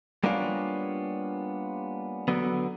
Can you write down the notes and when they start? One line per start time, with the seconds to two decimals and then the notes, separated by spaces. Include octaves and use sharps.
0.24 G3 A#3 B3 C#4 D4 F4
2.28 D3 F#3 B3